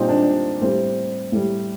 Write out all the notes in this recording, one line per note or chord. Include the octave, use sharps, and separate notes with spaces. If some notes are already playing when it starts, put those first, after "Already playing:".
Already playing: A#2 G3 C4 D#4
D4
A2 G3 C4
A2 G3